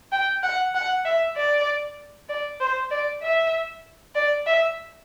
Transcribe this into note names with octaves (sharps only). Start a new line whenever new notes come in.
G5
F#5
F#5
E5
D5
D5
C5
D5
E5
D5
E5